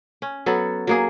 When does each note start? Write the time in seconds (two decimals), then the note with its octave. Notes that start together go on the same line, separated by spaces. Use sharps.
0.22 C#4
0.46 F#3 B3 A4
0.87 F#3 A#3 G#4